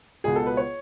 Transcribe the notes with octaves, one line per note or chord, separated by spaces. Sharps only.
C#2 B2 G#4
A4
B4
C#5